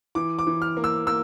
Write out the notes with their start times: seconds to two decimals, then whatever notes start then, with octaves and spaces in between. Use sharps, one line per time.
0.15 E3 D6
0.39 D6
0.47 E3
0.62 F6
0.77 A#3
0.84 E6
1.07 A#3 E6